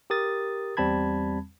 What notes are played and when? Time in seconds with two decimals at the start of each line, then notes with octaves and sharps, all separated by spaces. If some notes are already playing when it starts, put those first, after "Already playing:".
0.10 G4 A#4 D#6 A6
0.77 E2 G3 C4 A5 B5 G#6